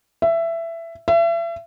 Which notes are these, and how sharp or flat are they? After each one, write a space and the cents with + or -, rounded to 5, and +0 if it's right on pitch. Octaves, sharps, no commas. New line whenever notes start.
E5 +15
E5 +35